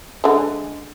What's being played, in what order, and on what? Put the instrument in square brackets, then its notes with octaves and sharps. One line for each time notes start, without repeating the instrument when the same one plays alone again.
[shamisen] D3 G#3